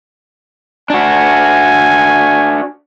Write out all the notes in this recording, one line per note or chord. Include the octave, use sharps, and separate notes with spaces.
D4 F#4 G#5